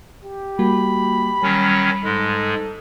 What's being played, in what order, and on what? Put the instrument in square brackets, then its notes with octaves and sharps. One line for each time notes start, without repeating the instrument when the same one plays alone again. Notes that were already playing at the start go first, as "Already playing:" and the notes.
[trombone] G4
[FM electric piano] G3 A#3 F#4 [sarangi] B5
[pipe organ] D#3 F#3 C#4 [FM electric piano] G3
[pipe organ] G#2 G#3 [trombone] A4